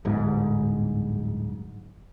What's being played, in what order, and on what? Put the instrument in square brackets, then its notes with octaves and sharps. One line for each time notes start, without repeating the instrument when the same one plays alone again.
[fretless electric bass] D1 G1 G#2